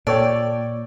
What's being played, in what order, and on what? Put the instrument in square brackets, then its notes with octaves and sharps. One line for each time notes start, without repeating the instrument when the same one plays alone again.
[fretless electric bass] A#2 [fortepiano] A4 C#5 G5 [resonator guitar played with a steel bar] D5